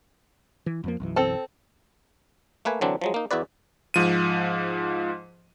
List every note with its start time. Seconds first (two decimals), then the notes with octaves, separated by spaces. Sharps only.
0.66 E3
0.84 F2 F3 A#3
1.00 B1 F#2 E3
1.16 C4 A4 A5
2.65 A3 A#3 B4 G#5
2.81 D3 E3 F#3 C4 D4
3.01 F3 F#3 G#3
3.14 A#3 D#4
3.31 E2 E4 F#4 B4 D5
3.94 G#2 F3 D#7